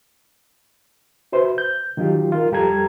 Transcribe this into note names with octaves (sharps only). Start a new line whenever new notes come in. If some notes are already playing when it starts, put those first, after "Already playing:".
F#4 B4 C5 E5
G6
D#3 F#3 D#4 F4 G4
F4 A#4
F2 G3 G4 A4 A#5 G#6